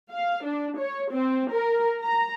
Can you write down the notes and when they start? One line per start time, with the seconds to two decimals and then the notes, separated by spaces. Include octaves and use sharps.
0.12 F5
0.46 D4
0.80 C#5
1.13 C4
1.52 A#4
2.01 A#5